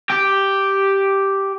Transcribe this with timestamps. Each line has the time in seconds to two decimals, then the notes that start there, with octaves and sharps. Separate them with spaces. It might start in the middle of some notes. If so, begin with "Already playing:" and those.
0.10 G4